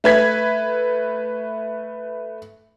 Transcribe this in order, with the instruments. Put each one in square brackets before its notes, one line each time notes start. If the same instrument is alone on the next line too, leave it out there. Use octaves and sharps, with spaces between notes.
[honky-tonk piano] A3 B4 G#6 B6